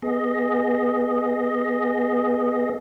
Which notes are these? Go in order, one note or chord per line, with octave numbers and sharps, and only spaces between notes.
B3 G#4 D#5